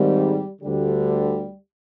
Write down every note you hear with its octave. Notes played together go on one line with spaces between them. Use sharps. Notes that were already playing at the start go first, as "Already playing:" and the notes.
Already playing: G#1 G#2 D#3 G3
D2 D3 G3